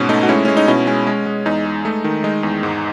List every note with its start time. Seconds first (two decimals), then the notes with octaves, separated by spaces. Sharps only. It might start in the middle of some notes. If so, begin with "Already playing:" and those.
Already playing: G#2 B2 C#4
0.09 A3 D#4
0.23 F#4
0.29 G#3 C#4 E4
0.45 G#3 C#4
0.57 D#4
0.68 B2 C#4 E4
0.87 G#3 C#4
1.07 G#3
1.26 G#3
1.46 E2 D#4
1.65 G#3
1.85 A3
2.04 D#3
2.24 G#3 D#4
2.43 E2
2.63 G#2